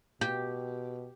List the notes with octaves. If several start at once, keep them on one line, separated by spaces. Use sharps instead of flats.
B2 G4